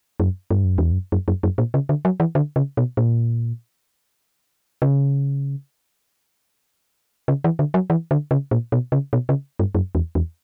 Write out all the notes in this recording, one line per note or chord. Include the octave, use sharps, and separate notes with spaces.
F#2
G2
F#2
E2
F#2
F#2
F#2
F#2
A#2
C#3
D3
F#3
E3
D3
C#3
B2
A#2
C#3
C#3
E3
D3
F#3
E3
D3
C#3
A#2
B2
C#3
B2
C#3
G2
F#2
E2
E2